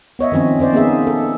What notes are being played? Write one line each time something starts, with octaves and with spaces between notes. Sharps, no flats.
B3 C#5 D#5 E5
D#3 F3 C4 C#4 D#5
C4 D#4 C5 D5
A#3 B3 C#4 D#4 G#4 E5
A4